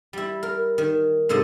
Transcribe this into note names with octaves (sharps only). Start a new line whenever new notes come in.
G3 E4
A#4
D#3
G#2 C3 A4 D#5 A5